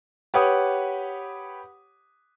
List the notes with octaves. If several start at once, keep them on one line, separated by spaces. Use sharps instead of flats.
G4 B4 C#5 F#5 D#6